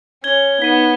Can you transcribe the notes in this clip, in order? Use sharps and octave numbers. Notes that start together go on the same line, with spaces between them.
C#4 G#6 G7
B3 D#4 B6 D#7